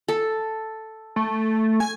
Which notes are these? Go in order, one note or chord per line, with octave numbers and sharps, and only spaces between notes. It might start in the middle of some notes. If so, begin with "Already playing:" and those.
A4
A3
G#5